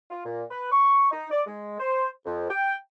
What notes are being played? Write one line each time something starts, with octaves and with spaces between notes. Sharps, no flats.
F4
A#2
B4
C#6
D#4
D5
G#3
C5
F2
G5